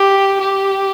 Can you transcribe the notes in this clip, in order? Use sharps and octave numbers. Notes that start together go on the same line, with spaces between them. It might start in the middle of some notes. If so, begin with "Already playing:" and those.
Already playing: G4
G4